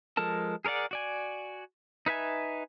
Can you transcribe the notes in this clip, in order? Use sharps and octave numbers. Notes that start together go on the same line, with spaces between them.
F3 G#3 A4 A#4 A5
G#4 A#4 C#5 D5 F#5
F#4 D5 G#5
D#4 B4 E5 G#5